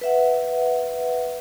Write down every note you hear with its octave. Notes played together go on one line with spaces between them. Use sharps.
B4 E5 F#5